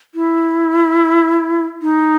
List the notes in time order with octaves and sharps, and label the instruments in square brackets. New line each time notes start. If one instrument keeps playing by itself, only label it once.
[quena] E4
D#4